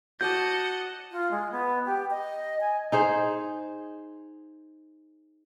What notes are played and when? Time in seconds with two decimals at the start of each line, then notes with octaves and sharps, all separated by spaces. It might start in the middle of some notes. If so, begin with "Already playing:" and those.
0.21 F#4 C#5 D#5 F#5 A5 D6 G6
1.12 F4
1.31 G#3
1.52 B3
1.85 G4
2.10 D#5
2.60 G#5
2.92 D#4 G#4 C5